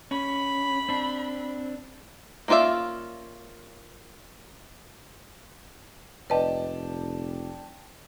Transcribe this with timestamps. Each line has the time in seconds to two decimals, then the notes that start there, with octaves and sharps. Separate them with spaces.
0.11 C#4 B5
0.89 C4 D4
2.48 A#3 C#4 F4 D5 E5
6.30 F1 B4 D5 D#5 G5 A5